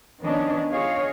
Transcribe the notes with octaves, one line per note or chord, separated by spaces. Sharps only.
D#3 F3 B3 C#4 D4 D#5
F4 G#4 C#5 D#5 F5